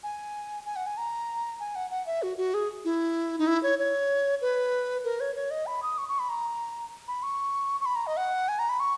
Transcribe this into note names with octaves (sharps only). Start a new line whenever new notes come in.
G#5
G#5
F#5
G#5
A#5
G#5
F#5
F#5
E5
F#4
F#4
G#4
E4
D#4
E4
C#5
C#5
B4
A#4
C#5
C#5
D#5
B5
D#6
C#6
C#6
B5
A#5
B5
C#6
C#6
B5
A#5
D#5
F#5
G#5
A#5
B5
C#6